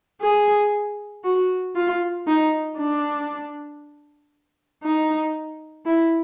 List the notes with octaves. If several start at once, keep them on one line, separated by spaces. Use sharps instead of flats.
G#4
F#4
F4
D#4
D4
D#4
E4